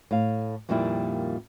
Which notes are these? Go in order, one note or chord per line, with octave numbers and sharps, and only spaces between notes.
A2 F5
F2 A#2 D#3 G3 A#3 E4